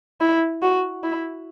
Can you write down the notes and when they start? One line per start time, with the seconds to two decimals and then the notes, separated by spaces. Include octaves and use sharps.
0.21 E4
0.62 F#4
1.03 E4